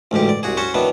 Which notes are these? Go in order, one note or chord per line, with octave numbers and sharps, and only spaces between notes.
A1 D2 G#2 G4
D5
C2 F#4 G#4
C#4 F#4 C5 C#5
D#3 E3 F#3 B3 D4